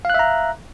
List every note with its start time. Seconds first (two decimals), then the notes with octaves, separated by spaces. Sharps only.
0.05 F5
0.10 F#6
0.14 E5
0.19 A#5